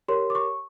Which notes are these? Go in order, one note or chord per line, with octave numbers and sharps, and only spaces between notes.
G4 A#4 C#5 C6
D6
C#6